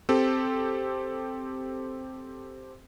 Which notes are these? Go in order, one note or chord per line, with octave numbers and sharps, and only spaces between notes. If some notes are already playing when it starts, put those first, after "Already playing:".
C4 G4 A4